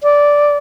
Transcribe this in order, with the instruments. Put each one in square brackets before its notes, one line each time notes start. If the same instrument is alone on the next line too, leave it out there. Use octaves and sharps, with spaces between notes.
[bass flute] D5